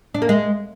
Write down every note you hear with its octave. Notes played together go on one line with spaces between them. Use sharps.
D4
A#3
G#3